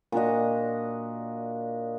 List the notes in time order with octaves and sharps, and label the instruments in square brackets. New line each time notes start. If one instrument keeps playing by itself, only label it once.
[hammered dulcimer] A#2 D4 F#4 D#5